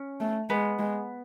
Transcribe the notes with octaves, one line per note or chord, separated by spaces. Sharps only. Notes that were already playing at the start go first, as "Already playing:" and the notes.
Already playing: C#4
A3
G#3 B3
G#3